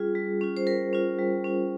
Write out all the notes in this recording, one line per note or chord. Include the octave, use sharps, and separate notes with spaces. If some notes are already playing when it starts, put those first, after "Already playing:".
Already playing: G3 C#4 F4 G#4
G3
C#4 F4
C5
G3 A#4
C#4 F4
G3
C#4 F4